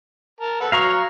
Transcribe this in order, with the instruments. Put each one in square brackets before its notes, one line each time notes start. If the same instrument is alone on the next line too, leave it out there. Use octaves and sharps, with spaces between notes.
[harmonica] A#4 A5
A4 B4 F#5
[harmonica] F#3 [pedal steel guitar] F5 A#5 C#6